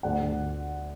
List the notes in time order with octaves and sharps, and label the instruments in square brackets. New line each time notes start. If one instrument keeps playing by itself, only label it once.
[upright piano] D2 D5 F#5
D2